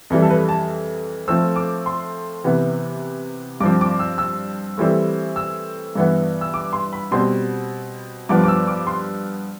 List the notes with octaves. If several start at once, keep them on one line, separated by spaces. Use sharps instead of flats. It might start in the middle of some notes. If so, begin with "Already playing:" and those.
F2 E3 G3
A4
B4
A5
A2 F3 A3 C4 E6
D6
C6
C3 E3 B3
G2 F3 C4 D6
D6
E6
E6
A2 E3 G3 C4
E6
G2 E3 B3
E6
D6
C6
B5
B2 G3 C4 C6
G2 F3 B3 D6
D6
E6
D6
C6